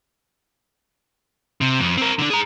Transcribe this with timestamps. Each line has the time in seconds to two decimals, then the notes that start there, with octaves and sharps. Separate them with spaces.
1.61 C3
1.79 F2
1.97 C4 A#4
2.19 D3 D4
2.30 G#4 A#5